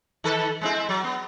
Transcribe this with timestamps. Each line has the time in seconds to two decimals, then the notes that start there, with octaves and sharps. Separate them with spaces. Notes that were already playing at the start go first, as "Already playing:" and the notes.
0.24 D#3 A4 B4
0.61 G#3 C4 E4
0.89 F#3
1.04 B3